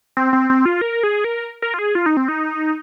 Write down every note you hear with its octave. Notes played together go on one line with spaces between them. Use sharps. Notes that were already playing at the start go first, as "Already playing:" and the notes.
C4
C4
C4
F4
A#4
G#4
A#4
A#4
F4
G#4
F4
D#4
C4
D#4